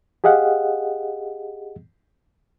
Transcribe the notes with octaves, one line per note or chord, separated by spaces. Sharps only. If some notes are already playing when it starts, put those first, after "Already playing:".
G4 G#4 D#5 F5 F#5